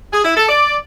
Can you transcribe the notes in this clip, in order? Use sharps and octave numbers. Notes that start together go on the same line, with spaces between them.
G#4
E4
A4
D5